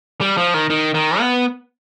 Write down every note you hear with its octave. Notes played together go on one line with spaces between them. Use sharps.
G3
F3
D#3
D#3
D#3
B3